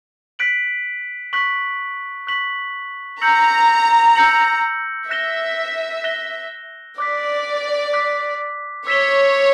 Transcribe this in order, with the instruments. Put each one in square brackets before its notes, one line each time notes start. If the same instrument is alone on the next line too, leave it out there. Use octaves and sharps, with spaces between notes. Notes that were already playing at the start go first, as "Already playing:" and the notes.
[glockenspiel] F#6 B6 D7 F#7
C#6 F#6 B6 F#7
C#6 F#6 B6 F#7
[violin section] A#5 [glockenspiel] E6 G6 A#6 C#7 F#7
[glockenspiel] E6 G6 A#6 C#7 F#7
[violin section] E5 [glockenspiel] F#6 A#6 E7 G7
[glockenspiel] F#6 A#6 E7 G7
[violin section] D5 [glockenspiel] D6 F#6 B6
[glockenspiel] D6 F#6 B6
[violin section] C#5 [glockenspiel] E6 B6 E7 G7